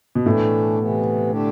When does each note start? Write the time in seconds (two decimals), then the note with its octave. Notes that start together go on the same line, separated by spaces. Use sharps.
0.15 B2
0.26 A2 E3 A3 D4
0.78 C3 E3 B3
1.31 D3 A3 D4 G4